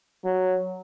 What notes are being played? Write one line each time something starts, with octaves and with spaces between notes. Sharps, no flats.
F#3